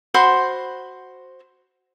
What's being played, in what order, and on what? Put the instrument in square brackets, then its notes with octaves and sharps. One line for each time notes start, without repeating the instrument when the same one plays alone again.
[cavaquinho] F#4 C5 B5 C6